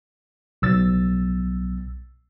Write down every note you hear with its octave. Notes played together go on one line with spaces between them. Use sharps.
B1 E6 A6